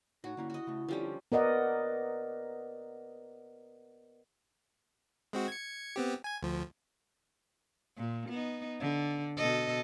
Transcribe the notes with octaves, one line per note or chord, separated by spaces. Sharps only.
A2 D#4 F#4 C#5
D3 A#3 C#4 E4
F#4 D#5
C#3 A3
D3 F3 G3 C#4 G4
B3 A#4 D5 D#5 F#5
G#3 C4 F#4
G#6 C#7
B3 C4 G4
G#5 G#6
D2 F3
A#2
B3 D#4
D3
B2 A4 D#5